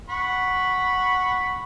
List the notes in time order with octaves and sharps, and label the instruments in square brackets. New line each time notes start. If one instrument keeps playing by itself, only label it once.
[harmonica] F#5 B5 C#6